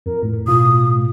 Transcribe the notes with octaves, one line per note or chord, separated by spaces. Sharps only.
F2 A#4
A2
B2 F4 D#6